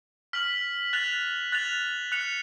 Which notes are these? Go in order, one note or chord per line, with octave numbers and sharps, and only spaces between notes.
F6 B6 F#7
F#6 A6 F7
F#6 A6 F7
F#6 C#7 F7